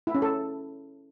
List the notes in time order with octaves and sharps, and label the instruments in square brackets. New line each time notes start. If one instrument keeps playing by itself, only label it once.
[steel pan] E4
C#4
A4